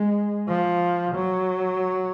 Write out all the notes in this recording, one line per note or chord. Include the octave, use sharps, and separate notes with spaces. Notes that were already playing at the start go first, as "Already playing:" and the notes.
Already playing: G#3
F3
F#3